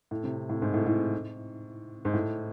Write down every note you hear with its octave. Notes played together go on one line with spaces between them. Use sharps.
A2
C3
A2
G#2
A2
A2
G#2
A2